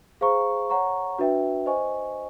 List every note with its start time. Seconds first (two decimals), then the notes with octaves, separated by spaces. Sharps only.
0.21 G#4 C5 F5 A#5 C#6
0.70 C#5 F#5 A#5 C#6
1.19 D4 F#4 B4 E5 G5
1.66 C5 D#5 G#5 C#6